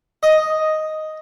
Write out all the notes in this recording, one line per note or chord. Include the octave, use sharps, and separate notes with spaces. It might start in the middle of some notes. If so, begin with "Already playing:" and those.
D#5